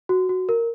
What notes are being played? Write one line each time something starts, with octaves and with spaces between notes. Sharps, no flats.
F#4
F#4
A#4